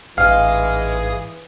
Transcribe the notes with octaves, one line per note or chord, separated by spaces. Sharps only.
A1 G#2 E3 G#4 D#5 F5